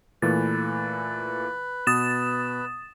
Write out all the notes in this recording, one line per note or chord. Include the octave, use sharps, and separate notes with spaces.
A#2 E3 A3 B4 A6
B2 D#6 A6 E7